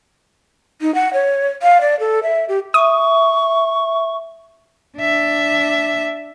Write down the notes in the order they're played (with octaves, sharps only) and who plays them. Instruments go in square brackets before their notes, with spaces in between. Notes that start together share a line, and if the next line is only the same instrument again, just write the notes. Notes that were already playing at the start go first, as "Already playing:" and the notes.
[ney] D#4
F#5
C#5
F5
D5
A4
E5
G4
[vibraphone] E5 [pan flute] C#6 [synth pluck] D#6
[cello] D4 E5